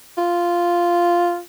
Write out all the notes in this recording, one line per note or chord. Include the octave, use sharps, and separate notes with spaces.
F4